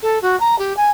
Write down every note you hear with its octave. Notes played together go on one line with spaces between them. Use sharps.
A4
F#4
A#5
G4
G#5